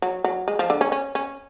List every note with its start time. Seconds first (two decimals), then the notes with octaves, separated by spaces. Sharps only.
0.02 F#3
0.24 F#3
0.48 G#3
0.59 F3
0.70 D3
0.81 C#4
0.92 C#4
1.15 C#4